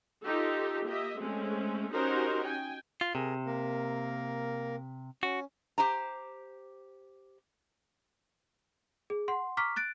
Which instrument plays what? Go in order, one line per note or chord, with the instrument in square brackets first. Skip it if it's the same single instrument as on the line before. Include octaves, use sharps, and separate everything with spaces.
[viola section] D#4 F4 G4 A4
A#3 G4 D#5 E5
G#3 A3 C4 C#4
C#4 D#4 F#4 G4 A#4 C5
G5 G#5
[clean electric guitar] F4
[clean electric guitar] C3 [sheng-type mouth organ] G#4 A#4
[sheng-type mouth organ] A#3 A#4
[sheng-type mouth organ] C#4 [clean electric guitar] F#4
[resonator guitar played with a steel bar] G4 C5 A#5
[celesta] G#4
F#5 C6
A#5 C#6 D6 F6 B6
F#6 A6 D7